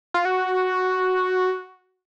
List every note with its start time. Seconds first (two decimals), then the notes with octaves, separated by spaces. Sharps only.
0.14 F4
0.25 F#4